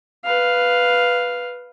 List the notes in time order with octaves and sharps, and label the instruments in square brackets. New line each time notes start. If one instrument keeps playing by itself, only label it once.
[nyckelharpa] B4 F5